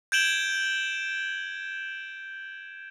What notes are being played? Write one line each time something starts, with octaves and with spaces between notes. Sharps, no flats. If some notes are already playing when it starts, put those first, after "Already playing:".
G6 G#6 D7 E7 F#7 G7